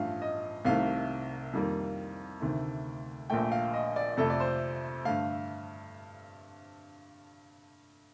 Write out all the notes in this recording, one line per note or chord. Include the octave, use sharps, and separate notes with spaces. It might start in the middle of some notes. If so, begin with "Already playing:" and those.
Already playing: A1 G2 F3 A3 F5
D#5
C2 C3 D#3 A3 F5
F2 D#3 G3 A#3
D2 C3 D#3 A3
A#1 A#2 A3 G5
F5
D#5
D5
F2 C3 F3 A3 A4
D5
C5
G2 D3 A3 F5